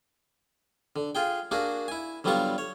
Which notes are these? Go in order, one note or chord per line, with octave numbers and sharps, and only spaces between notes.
D3
F4 G#4 G5
A#3 D4 F#4 G#4
E4 G#5
D3 F#3 G3 B3 F4 C#6
C#5